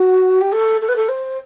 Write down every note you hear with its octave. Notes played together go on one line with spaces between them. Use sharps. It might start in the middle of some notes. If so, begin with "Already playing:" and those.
Already playing: F#4
G4
A4
A4
B4
A4
C5